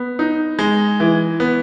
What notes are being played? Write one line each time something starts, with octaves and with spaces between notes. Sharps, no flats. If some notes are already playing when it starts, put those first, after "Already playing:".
Already playing: B3
D#4
G#3
E3
B3